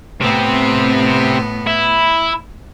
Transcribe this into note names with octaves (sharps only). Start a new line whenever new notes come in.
A2 C3 B3 C4
E4